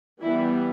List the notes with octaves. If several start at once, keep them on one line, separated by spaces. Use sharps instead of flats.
E3 G3 B3 E4